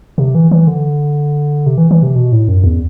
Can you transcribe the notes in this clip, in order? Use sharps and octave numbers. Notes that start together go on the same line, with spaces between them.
C3
E3
E3
D3
C3
E3
E3
C3
B2
A2
F#2
E2